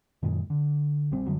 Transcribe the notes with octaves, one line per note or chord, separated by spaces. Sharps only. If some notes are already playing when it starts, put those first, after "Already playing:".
F#2 A#2 D#3 G#3
D3
A#1 G3 C4
F#1 D3 F#3 G3